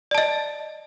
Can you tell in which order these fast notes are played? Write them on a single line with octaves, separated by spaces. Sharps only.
D5 A5 D#5